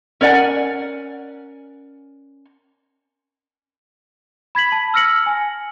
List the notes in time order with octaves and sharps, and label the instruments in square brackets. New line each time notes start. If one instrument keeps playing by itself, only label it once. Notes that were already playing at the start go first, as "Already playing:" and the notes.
[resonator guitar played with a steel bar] C#4 A#4 D5 F#5 G#5
[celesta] B5 G#6 B6 F#7
A5
E6 F6 A#6 C#7 F#7
G#5